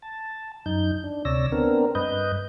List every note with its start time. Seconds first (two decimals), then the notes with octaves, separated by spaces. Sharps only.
0.02 A5
0.66 F#2 D#4 G6
1.04 D4
1.25 D2 C3 C#5 D5 E6 A#6
1.52 B3 C4 D4 A#4
1.95 G2 B4 D#5 G6